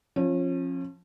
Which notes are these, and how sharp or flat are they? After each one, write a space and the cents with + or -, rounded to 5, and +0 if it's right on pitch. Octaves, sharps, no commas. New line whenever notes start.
F3 +0 C#4 -35